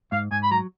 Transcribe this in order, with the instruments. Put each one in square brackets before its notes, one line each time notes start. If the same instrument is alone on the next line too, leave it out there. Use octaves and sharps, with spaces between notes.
[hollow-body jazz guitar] G#2 [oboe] F5
[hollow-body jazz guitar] G#2 [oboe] G#5
[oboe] B5
[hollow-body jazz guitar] F#3 [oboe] A#5